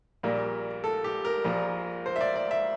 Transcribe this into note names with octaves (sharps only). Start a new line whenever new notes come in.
A#1 A#2 G3 A#3
A4
G4
A#4
A#1 A#2 F3 A#3
C5
E5
D5
D5
E5